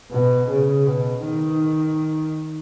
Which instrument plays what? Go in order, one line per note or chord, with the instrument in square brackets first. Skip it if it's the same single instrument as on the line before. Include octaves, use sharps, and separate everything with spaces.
[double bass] B2
C#3
B2
D#3